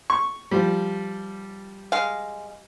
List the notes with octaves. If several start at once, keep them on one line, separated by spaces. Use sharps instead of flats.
C#6
F3 G3
G#3 F5